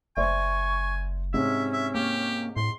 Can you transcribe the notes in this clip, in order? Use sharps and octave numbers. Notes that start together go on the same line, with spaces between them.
F#1 C5 D5 E5 G#5 C#6
G#2 C3 C#4 E5
E5
A#3 G4
A2 C6